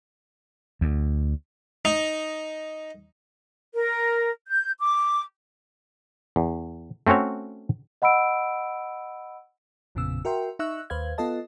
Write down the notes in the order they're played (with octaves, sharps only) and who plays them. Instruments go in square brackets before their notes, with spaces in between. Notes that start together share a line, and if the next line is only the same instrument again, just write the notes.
[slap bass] D2
[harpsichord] D#4
[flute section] A#4
G6
D6
[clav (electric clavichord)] E2
A3 C4 C#4 F#4 C#5
[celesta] D#5 F#5 B5 E6 D7
[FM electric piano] A1 F2 A#2 C#3 B3 E6
F#4 A#4 E5 G5 C6
D#4 E5 C#6 E6 F#6
D#2 B4 C5 F5 G#6
B3 F4 A4 D#5 A5